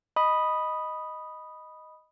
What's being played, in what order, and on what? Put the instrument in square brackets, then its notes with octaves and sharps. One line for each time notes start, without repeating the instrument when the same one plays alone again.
[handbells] D#5 B5 D#6